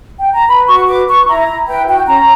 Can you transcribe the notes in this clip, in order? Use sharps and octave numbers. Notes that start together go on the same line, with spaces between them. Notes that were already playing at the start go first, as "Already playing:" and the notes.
G5
A#5
B4 B5
F#4 C#6
B4 D6
B4 C#6
E4 A#5
E4
B4 G5
F#4 G5
C#4 A#5